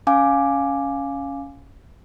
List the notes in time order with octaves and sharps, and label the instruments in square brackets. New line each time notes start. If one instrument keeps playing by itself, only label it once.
[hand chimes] C#4 F5 G#5 D6